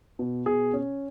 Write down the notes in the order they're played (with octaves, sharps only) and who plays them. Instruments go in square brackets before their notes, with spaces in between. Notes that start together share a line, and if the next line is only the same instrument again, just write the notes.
[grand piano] B2
B2 G#4
C#4